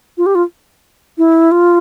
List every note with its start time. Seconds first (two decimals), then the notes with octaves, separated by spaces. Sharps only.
0.18 F4
0.26 G4
0.35 F4
1.18 E4
1.51 F4